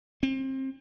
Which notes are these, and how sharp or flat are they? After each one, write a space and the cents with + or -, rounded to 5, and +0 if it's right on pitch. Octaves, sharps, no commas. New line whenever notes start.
C4 +30